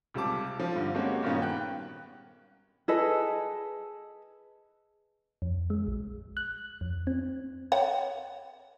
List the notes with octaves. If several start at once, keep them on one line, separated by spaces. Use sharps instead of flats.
C#2 C3 G3 A5 D6
F3
G2 D3
G#3 A#3 C4 C#4 F#4 G4
G2 A#2 D#3 A#3 B3 C#4
G5 F#6
G#4 A4 B4 D#5
F2
G#3
A#1
F#6
F2
C4
C#5 F#5 G5